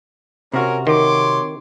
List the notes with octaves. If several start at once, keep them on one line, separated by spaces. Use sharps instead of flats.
C3 C#4 F#4 A#4
D#3 C#5 C6 D6